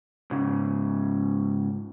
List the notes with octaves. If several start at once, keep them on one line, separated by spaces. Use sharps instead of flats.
G#2 C#3